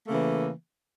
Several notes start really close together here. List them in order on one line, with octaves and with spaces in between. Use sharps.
A#3 A3 C#3 E3